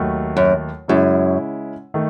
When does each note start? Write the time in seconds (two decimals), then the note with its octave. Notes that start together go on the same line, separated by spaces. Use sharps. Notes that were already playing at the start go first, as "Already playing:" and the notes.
Already playing: D#2 D#3 F#3 A3
0.37 F#2
0.88 F#2 C#3 G#3 C#4 E4
1.94 D#3 A3